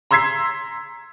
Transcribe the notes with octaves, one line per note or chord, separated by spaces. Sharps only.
A#5 C6 E6 G#6 B6 C7